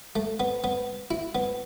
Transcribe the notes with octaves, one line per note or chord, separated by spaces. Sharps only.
A3
B3
B3
E4
B3